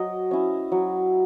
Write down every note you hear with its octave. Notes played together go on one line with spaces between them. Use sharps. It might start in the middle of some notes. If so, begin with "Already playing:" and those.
Already playing: F#3 D#5
C#4 E4
F#3